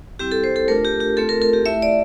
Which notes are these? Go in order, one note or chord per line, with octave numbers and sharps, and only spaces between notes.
G3 C4 E4 G4
A4
C5
A4
A3 D4 F4 A#4
G4
G4
A3 C4 F4 A4
A#4
A#4
G4
A3 E4 E5
D5